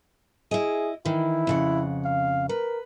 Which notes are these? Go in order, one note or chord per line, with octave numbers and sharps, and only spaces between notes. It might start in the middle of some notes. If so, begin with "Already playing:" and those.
E4 G#4 D#5
D#3 E3 E4
F2 C#3 F#5
F5
A#4 B4